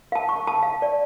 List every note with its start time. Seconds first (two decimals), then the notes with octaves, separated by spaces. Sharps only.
0.12 F5 A5
0.29 C#6
0.47 A5
0.63 F5
0.82 D5